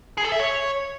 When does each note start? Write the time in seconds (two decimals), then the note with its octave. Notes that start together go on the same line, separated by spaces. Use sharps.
0.17 G#4
0.25 A4
0.32 E5
0.39 C#5